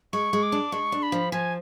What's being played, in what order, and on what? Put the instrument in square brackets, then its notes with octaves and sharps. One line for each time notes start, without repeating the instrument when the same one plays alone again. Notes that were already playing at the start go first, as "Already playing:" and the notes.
[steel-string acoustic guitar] G#3 [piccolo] C#6
[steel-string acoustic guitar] G#3
[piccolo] D6
[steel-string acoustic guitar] D4
[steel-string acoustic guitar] G#3 [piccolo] C#6
[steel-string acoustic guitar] D4
[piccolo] B5
[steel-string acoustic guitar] F3
[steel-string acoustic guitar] F3 [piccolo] G#5